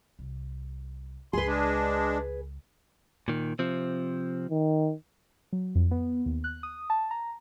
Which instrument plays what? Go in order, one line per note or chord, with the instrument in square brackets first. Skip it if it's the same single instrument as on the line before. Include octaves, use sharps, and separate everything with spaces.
[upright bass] C2
[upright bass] C#2 [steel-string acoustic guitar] G#4 B4 [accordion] C6
[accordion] G#3 D4
[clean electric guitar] A#2 D#3
C3 F3 C4
[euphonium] D#3
[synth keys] F#3
F2
B3
D#2
F#6
D#6
A5
A#5